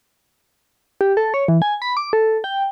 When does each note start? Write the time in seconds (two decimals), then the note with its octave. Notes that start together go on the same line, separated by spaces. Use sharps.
1.01 G4
1.17 A4
1.34 C#5
1.48 E3
1.62 G#5
1.82 B5
1.97 D6
2.13 A4
2.44 G5